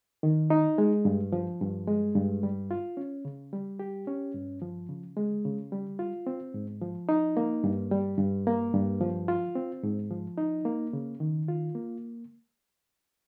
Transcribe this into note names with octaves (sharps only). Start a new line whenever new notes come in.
D#3
D#4
G#3
G2
F3
G2
G#3
G2
G3
F4
C#4
C#3
G3
G4
C#4
G2
F3
C#3
G#3
C#3
G3
F4
C4
G#2
F3
D#4
A#3
G2
G3
G2
A#3
G2
F3
F4
C4
G#2
F3
D#4
A#3
C#3
D#3
F4
A#3